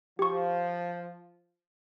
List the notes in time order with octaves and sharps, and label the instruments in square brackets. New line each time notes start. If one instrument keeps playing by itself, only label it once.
[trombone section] F3 [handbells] G4 C#6